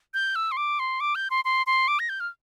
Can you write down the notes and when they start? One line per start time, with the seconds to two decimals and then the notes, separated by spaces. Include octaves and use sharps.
0.14 G6
0.36 E6
0.52 C6
0.57 D6
0.79 C6
1.00 D6
1.15 G6
1.30 C6
1.45 C6
1.67 C6
1.88 D6
1.99 A#6
2.09 G6
2.20 F6